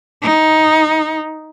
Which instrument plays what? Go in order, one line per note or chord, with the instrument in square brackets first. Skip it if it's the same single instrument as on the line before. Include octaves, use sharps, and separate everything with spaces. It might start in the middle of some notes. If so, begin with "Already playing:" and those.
[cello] D#4